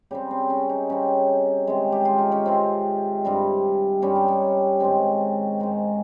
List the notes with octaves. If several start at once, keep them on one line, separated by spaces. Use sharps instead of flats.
C#3 G3 C4 G4
C4
C#4
D#4
C#3 G3 C4 C#4
C3 D#3 G#3
G4
F4
D#4
C#4
C3 D#3 G#3 C4
G2 G3 C4
G2 G3 C4 C#4
D#4
C#4
G#2 D#3 G#3 C4
G#2 D#3 G#3 C4